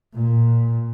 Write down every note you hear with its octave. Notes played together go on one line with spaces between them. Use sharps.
A#2